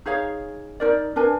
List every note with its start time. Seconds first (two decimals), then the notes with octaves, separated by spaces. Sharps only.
0.06 D#4 G#4 C#5 F5
0.80 D#4 A#4 D5
1.16 D4 A#4 B4 G#5